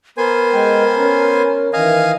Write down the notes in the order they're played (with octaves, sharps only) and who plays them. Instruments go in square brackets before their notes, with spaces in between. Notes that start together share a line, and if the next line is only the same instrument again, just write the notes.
[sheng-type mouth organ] B3 C5 G#5 [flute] A#4
[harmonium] G#3 G5
C#4
[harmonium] D#3 E3 [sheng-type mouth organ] D#5 F5 G#5